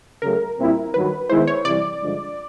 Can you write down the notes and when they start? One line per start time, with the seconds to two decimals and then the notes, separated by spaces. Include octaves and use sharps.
0.22 C#3 F#3 A3 A#4
0.59 A#2 G3 C4 E4
0.94 G2 D#3 F#3 B4
1.29 D#3 G#3 B3 E4 C5
1.47 C#5
1.65 C3 E3 G3 D5
2.01 G2 D3 F3 G#3